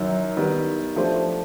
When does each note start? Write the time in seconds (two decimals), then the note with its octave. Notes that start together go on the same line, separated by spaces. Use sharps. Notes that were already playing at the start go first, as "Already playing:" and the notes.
Already playing: F#2 D#3 F#3
0.37 D#3 G3 B3
0.96 F3 A3 D4 G4 C5